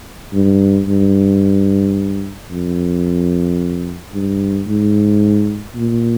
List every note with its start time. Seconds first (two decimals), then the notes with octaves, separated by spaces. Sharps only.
0.33 G2
0.88 G2
2.51 F2
4.13 G2
4.67 G#2
5.76 A#2